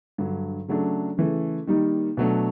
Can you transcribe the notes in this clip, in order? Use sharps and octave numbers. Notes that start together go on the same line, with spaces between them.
G2 D3 F#3
C#3 F#3 A3 D4
C#3 E3 A3
D#3 G3 A#3 D#4
B2 F#3 A3 D4